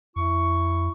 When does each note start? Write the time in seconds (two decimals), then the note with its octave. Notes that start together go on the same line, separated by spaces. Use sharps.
0.16 F2 E4 C#6